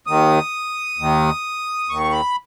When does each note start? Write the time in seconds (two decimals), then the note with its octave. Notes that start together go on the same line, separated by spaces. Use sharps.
0.07 D#2 D#3 D#6
0.98 D#2 D#3
1.89 D#2 D#3 C#6
2.12 B5